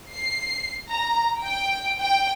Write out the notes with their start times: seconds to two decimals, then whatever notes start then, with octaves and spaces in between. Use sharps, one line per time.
0.11 C7
0.89 A#5
1.41 G5
1.99 G5